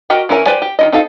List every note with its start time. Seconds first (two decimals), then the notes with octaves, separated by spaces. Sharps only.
0.10 F#4 G4 A#4 D#5 G5
0.29 E3 C#4 E4 A#4 G#5
0.46 G4 B4 C5 D5 G#5
0.62 G4
0.79 D#3 E4 D#5
0.92 C4 D#4 A4 F5